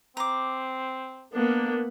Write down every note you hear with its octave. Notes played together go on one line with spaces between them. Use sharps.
C4 A#5 D6
A#3 B3 D4